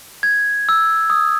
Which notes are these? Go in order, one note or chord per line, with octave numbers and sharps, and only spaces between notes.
G#6
E6
D#6